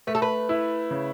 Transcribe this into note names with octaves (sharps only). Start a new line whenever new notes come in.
A3 B4
A4
B4
E4
C#3